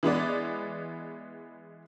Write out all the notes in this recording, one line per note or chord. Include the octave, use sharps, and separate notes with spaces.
E3 G#3 B3 D5